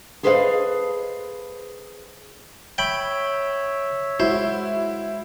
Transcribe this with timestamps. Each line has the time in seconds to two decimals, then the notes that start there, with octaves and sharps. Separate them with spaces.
0.23 G#4 A4 B4 C5 D#5 F5
2.78 C#5 E5 G5 B5
4.20 G#3 E4 F#4 C5